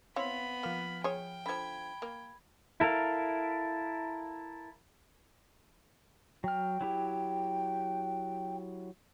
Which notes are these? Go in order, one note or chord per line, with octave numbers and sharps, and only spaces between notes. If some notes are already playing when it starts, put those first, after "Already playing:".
B3 C4 E4 C#5 F5 B5
F3 A#3 F6
G#4 C#5 G5
D3 F3 B5 G#6
A#3
E4 A4 A#4 F5
F#3 G5 F6
F#3 E4 G4